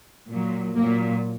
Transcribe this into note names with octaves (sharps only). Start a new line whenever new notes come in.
A#2 F#3
A#2 F#3 A#3